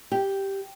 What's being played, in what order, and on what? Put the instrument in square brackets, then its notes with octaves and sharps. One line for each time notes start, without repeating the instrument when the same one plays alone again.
[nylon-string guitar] G4